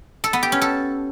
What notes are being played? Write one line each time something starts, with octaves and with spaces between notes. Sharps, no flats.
A4
B3
G4
C#4
A4